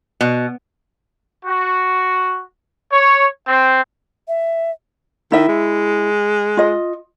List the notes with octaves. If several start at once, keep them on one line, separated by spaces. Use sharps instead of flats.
B2
F#4
C#5
C4
E5
D#3 E4 E5
G#3
F4 D#5